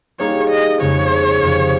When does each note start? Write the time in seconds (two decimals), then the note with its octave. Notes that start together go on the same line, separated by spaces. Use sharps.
0.19 G3 A#3 D#4 G#4 C#5
0.50 D#5
0.80 F2 C#3 G#3 C#4 C#5
1.41 F2 C3 F3